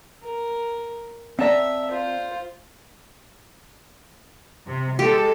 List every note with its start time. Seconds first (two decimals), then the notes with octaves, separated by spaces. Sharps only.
0.23 A#4
1.39 C4 D5 E5 F#5 A5 A#5
1.90 F4 C5
4.67 C3
4.99 G#3 G4 A4